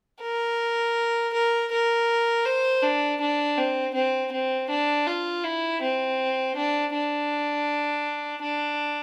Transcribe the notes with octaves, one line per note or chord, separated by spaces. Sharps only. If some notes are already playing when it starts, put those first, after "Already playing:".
A#4
A#4
A#4
C5
D4
D4
C4
C4
C4
D4
F4
E4
C4
D4
D4
D4